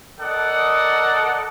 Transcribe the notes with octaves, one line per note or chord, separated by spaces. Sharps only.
A4 A#4 D5 D#5 F#5